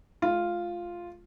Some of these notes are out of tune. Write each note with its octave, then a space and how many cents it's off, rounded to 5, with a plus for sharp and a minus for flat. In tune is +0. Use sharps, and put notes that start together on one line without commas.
G#3 +45 F4 +0